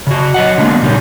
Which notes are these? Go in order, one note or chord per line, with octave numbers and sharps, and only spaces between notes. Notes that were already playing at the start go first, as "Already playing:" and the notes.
C#3 F#4
F#3 D#5 F#5
D3 F#3 G#3 A#3 B3
A#2 C#3 G3 D#4 G4